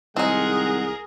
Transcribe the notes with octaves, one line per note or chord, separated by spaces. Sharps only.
C2 D#3 G#3 C4 D#4 G#4 A#4 F#5